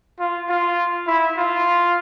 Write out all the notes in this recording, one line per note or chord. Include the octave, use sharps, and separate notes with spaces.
F4
F4
E4
F4